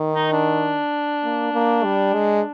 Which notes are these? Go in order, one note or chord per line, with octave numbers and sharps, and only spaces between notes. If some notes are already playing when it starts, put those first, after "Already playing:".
Already playing: D#3
D#4
D4
A#3
A#3
G3
G#3